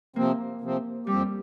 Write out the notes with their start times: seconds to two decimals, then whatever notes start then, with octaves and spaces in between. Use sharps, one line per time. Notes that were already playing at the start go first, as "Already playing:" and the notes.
0.16 C3 F3 A#3 C4
0.61 C3 F3 C4
1.07 F2 F3 G3 C4 G4